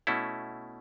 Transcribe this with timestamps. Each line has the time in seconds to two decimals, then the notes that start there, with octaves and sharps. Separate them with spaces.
0.07 B2 A3 C#4 E4